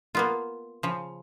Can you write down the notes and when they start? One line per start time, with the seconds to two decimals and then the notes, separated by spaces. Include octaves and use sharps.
0.15 A#3 B3 F4
0.83 C#3 F3